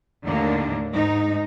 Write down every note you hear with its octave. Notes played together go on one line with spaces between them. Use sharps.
D#2 A2 D3 A#3 D4
G#2 G#3 D#4